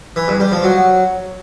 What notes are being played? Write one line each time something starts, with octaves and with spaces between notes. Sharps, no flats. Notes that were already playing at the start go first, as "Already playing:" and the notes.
E3
G2
G3
F3
F#3